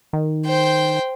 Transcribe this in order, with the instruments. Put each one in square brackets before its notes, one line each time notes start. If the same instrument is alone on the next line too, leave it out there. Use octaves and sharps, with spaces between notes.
[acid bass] D#3
[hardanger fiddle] C5 G5